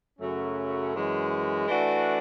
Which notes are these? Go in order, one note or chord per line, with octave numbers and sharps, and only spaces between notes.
F#2 C#3 F#3 A3 C#4
F#2 E3 G#3
E3 A3 D4 F#4